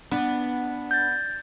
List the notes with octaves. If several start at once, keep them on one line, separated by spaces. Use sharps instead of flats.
B3 D4
G6 A6